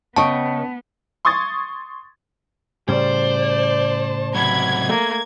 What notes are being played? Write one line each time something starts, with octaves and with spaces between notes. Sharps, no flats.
C#3 B3 D#5 G5 A5 C#6
C6 C#6 D#6 G#6 A6
A2 C#3 G3 C5 D5 A5
C3 F#3 B5 G#6
A3 A#3